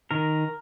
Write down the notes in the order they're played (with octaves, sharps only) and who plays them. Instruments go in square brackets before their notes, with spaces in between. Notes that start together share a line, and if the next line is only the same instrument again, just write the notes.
[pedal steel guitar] D#3 A#4